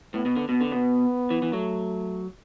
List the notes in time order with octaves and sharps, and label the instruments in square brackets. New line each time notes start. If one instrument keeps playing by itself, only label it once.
[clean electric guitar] A2 [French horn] B3
[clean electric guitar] B2
D3
[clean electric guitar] B2 [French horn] B3
[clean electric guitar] D3
B2
E3
E3
[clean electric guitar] F#3 [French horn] A3